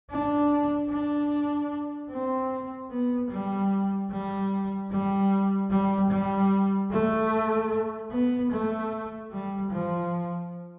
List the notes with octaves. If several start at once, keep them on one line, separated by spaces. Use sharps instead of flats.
D4
D4
C4
B3
G3
G3
G3
G3
G3
A3
B3
A3
G3
F3